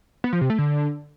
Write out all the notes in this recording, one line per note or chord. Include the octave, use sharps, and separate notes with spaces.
B3
F3
C3
A3
D3